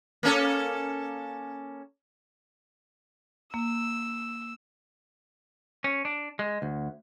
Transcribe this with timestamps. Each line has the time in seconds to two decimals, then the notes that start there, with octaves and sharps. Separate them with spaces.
0.23 A#3 C#4 A4
3.54 A#3 E6
5.84 C#4
6.05 D4
6.39 G#3
6.62 D2